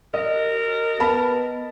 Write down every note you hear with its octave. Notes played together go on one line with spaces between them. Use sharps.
A#4 D#5
B3 A5 B5